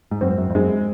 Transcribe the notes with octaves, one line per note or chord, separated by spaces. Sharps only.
G#2
F#2 C4
F#2
F2
F#2 G#3